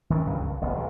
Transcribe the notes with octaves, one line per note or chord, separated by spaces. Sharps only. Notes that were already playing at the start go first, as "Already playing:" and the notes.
D#3 E3 A3 C#4
C#2 G2 D#3
C#2
E1 A1 B3
B1 A#2 D3 E3